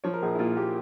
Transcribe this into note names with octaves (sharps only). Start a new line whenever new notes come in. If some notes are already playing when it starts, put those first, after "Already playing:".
F3 C#5
A#4
A#1 G#4
E4
A#2 F4
A#3 G4